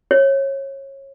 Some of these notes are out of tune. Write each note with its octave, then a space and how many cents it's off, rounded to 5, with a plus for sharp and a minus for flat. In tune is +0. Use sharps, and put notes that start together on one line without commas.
C#5 -25